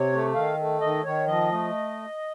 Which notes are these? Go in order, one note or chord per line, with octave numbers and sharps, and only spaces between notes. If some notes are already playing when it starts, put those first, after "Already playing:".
Already playing: C3 C#5
A3
D#3 F5
A3
D#3 D#5
D#3 C#5
F3 D#5
A3